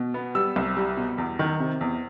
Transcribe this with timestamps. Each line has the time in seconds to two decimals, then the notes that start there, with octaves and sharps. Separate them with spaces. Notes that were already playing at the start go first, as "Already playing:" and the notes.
Already playing: B2
0.14 B3
0.35 G3 E6
0.56 C2
0.77 G3
0.97 B2
1.18 E2
1.39 D#3
1.60 C3
1.81 E2